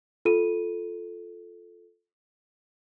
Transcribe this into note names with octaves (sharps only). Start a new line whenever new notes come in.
F4 A4 D#7